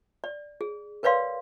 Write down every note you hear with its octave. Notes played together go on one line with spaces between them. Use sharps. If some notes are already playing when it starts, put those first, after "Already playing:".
D5
G#4
A#4 B4 C#5 D5 F5 C6